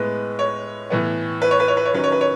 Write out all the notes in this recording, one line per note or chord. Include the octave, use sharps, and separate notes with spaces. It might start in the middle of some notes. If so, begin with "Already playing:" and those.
Already playing: A2 G#3 B3 B4
C#5
A2 E3 B3
B4
C#5
B4
C#5
B4
C#5
D#3 F#3 C#4 B4
C#5
B4
C#5